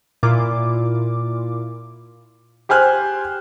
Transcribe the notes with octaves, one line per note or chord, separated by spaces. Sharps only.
A#2 E4 F4 D6
G4 C5 G#5 F6 F#6